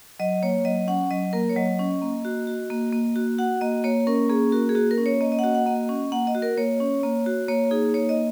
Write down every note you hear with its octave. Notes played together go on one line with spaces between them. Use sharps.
F#3 D#5
A#3 C#5
F#3 D#5
C#4 F#5
F#3 D#5
A#3 A#4
C#5
F#3 D#5
C#4
A#3
F#4
F#4
A#3
A#3
F#4
F#4 F#5
A#3 D#5
A#3 C#5
C#4 A#4
A#3 G#4
F#4 A#4
G#4
A#3 F#4
A#4
C#4
C#5
A#3 D#5
D#5
F#5
F#4 D#5
F#5
A#3 D#5
C#4
A#3 F#5
D#5
F#4
A#4
A#3 C#5
C#4
A#3
F#4
A#3 C#5
D#4 G#4
A#3 C#5
D#5